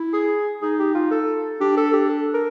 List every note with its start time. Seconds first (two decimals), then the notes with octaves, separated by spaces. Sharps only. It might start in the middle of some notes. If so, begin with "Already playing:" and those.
Already playing: E4
0.14 G#4
0.62 D#4 G#4
0.80 G4
0.95 F4
1.11 A4
1.60 D4 G4
1.77 A4
1.94 G4
2.09 A4
2.34 A#4